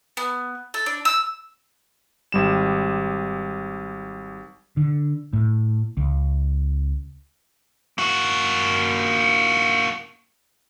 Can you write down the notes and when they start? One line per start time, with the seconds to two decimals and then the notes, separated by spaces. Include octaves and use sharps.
0.17 B3
0.74 A4
0.86 D4
1.05 E6
2.32 G#1 G3 E7
4.77 D3
5.33 A2
5.97 C#2
7.98 A#3 F#4